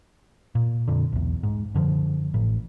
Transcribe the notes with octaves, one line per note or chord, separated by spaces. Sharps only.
A#2
F2 A#2 D3
B1 E2
G#2
F#2 D3 D#3 F3
A1 A2